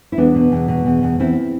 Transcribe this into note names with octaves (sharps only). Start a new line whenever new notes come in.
E4
E2 B3 D4
B2
E2
B2
E2
E2
E2 C4 E4